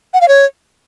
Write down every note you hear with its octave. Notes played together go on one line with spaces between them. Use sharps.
F#5
F5
C#5